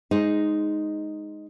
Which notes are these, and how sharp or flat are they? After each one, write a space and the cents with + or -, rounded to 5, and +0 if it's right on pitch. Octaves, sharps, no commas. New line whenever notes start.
G#3 +0 D#4 +0 C5 +0